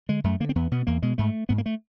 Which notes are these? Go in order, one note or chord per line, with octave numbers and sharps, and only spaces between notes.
D3 G#3
F#2 A3
D3 A#3
C4
E2 B3
B2 B3
E2 A#3
B2 G#3
G#2 A3
G#2 B3
A#3
A3